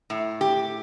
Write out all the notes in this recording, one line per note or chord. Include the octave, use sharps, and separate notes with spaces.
A2
G4